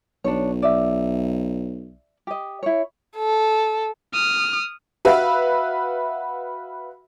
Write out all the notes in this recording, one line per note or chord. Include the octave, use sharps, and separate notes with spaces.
B1 D4 C#5
D5 E5
G4 D#5
E4 C#5
A4
D#6 F6
F#4 B4 E5 F5